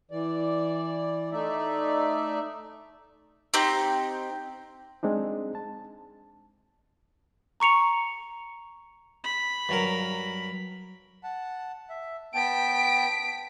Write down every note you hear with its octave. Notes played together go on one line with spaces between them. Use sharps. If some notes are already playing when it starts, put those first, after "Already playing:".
E3 D5
A3 D#4 D5 E5
C4 D#4 G4
G#3 C4 D4 D#4
A5
A#5 C#6 C#7 F7
B5
G2 F#3 A#4
F#5 A5
E5
B3 G5 A5 B6 D7